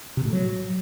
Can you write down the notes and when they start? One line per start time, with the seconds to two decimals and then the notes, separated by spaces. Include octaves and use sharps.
0.17 C3
0.25 A2
0.33 F#3